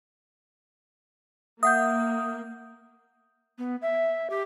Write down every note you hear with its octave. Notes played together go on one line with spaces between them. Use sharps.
A#3 E5 F#5 D#6 G6
B3
E5
G4